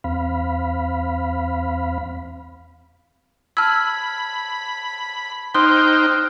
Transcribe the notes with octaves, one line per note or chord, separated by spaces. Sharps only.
E2 C4 F5 B5
A5 B5 E6 F6 G#6
D#4 C5 G5 C6 D#6 F6 F#6